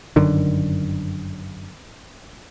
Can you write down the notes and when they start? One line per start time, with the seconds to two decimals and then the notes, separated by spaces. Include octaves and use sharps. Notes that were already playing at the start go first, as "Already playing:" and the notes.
0.16 G1 F#2 D3 D#3